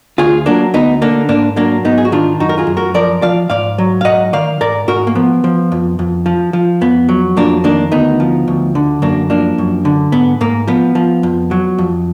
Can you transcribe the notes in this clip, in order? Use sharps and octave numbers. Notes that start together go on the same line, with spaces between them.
D2 F4 G#4
F#3 A#3 D4
D2 B3 D#4
D3 A#3 D4
G#2 A#3 D4
F#3 A#3 D4
G#2 B3 D#4
G#4
F#4
D#3 D4 F4
F#2 D#4 F#4
A#4
F4 G#4
F#2
F#4 A#4
F3 A#4 D5
F3 D5 F5
G#2 D5 F5
F#3
F5
G#2 D#5 F#5
D#3 D5 F5
G#2 A#4 D5
G#2 F#4 A#4
A#3
F3 B3
F3
F2
F2
F3
F3
F2 B3
F#3
F2 A#3 D4
D#3 A#3 D4
D2 B3 D#4
F3
D2
D3
F#2 A#3 D4
F3 A#3 D4
F#2
D3
G#2 B3
G#2 A#3
F3 B3
F3
F2
F#3
F2